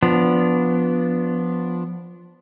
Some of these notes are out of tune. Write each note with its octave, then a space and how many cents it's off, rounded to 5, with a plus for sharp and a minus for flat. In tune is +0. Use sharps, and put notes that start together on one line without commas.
F3 +5 B3 +0 D4 -15